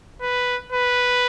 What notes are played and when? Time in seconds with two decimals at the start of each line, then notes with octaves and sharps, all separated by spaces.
0.22 B4
0.72 B4